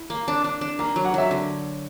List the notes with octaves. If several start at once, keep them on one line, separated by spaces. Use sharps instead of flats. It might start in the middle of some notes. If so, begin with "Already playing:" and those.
Already playing: E4
A#3
D4
D4
D4
A#3 A#5
F#3
F#5
F#3 E5
D3